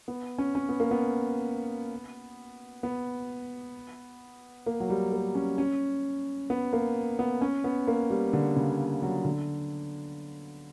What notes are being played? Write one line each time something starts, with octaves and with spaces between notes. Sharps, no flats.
B3
C#4
C#4
B3
A#3
B3
B3
A#3
F#3
G3
A#3
C#4
C#4
B3
A#3
B3
C#4
B3
A#3
G3
D3
C#3
F#3
D3